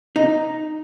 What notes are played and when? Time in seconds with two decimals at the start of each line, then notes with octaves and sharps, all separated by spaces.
0.16 D#4